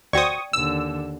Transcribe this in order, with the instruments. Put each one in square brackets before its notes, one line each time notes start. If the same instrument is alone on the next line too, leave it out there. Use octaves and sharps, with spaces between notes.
[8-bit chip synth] D2 F#4 C5 [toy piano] D5 G5 [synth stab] C#6 D#6
[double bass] D#2 D3 [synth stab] E6